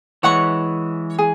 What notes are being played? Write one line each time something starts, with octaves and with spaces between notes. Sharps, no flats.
E3 G#3 C#5 F#5 C#6
G#4